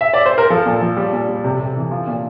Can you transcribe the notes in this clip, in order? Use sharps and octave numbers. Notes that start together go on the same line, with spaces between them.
E5
D5
C5
A#4
F3 A4
A#2
F3
G3
A#2
G3
C3
C3
E3
F3
A#2